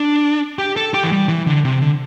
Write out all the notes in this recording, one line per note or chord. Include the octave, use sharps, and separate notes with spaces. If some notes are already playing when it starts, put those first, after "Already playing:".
Already playing: D4
G4
A4
G4
E3
G3
E3
D3
C3
D3